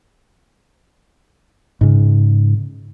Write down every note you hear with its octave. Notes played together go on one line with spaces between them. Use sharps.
G#2 C#3